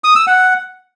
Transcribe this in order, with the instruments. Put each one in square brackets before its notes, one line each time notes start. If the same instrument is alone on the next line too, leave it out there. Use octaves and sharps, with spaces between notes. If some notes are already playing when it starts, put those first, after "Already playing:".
[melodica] D#6
E6
F#5